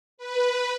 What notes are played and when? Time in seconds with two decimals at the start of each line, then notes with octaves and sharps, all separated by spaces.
0.18 B4